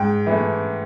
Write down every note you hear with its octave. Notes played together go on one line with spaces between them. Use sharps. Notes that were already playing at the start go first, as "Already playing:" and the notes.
Already playing: G#2 G5
E3
A3